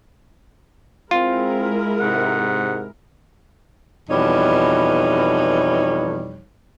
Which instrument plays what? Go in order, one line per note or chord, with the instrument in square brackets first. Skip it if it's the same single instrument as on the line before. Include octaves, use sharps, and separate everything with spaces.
[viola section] G#3 E4 A#4 [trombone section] C4 [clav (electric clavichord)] F4
[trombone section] G#2 C3 [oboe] F#5
[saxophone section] F2 B2 E3 G3 D#4 C#5